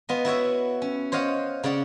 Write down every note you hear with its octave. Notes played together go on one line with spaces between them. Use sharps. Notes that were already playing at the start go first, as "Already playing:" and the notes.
B3 F4 D#5
E4 F#4 C#5 E5
C#4
C5 C#5 D#5 F5 F#5
C#3 C#5 D5 F#5